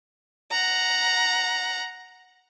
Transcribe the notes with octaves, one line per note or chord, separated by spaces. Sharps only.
F#5 A#5